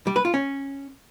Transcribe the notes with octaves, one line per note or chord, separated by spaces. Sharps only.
G3
B4
F4
C#4